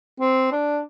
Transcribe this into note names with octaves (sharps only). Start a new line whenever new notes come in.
C4
D4